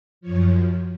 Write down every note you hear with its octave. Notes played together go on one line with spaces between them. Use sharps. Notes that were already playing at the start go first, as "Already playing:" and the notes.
F#2 F3 C#5